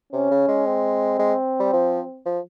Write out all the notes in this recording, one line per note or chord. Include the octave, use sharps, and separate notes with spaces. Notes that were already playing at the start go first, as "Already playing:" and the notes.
C3 C#4
C#3
G#3
C4
G#3
G3
F3
F3